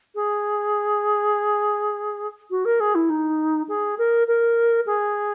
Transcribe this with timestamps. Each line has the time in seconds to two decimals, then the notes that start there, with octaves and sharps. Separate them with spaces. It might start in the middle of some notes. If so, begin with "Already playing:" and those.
0.15 G#4
2.50 F#4
2.65 A#4
2.80 G#4
2.95 E4
3.10 D#4
3.68 G#4
3.98 A#4
4.27 A#4
4.86 G#4